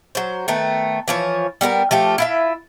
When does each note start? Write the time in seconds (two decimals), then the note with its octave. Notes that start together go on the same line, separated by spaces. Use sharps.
0.15 F#3 C5
0.48 D#3 A3 B3
1.08 E3 F3 C#5
1.61 G3 B3 D#4 A#4
1.91 F3 A3 G4 F5
2.18 E4 F4 E5